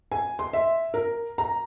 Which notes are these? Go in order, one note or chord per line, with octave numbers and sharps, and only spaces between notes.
G#5
C6
E5
A#4
A#5